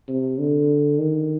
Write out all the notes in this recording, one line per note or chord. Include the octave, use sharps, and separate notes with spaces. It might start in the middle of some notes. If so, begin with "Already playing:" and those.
C3
D3
D#3